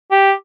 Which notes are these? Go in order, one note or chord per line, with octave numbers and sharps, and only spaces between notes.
G4